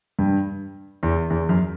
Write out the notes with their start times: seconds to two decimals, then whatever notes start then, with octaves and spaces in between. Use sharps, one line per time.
0.19 G2
1.03 E2
1.30 E2
1.49 F#2